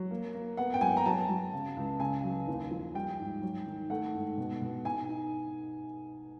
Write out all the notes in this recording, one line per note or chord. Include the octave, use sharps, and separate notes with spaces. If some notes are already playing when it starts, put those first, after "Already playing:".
Already playing: F#3
A#3
A#3
B3 F#5
G5
F#3 G#5
A#5
F#3 A5
F#3
C#3
C#2
C#3 G#5
F#3
D#2
F3
G3 G5
G#2
F#3
D#3
A3 F#5
G#2
B2
B2
D#4 G#5
D#4